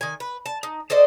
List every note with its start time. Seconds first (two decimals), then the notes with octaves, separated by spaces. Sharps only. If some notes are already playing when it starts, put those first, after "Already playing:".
0.01 D#3 G#5
0.20 B4
0.46 A5
0.63 D#4
0.90 A4 C5 D5 D#5